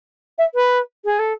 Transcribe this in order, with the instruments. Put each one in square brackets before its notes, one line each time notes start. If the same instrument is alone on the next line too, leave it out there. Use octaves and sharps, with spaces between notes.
[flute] E5
B4
G#4
A4